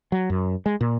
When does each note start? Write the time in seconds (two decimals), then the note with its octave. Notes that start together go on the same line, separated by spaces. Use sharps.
0.12 F#3
0.30 F#2
0.66 G#3
0.81 A#2